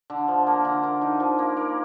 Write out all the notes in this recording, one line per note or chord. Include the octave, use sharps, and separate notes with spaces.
D3
F3
A#3
D3
A#3
D#4
F3
A#3
A#3